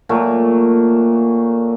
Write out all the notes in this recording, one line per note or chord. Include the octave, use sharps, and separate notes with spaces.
A#2 F#3 A3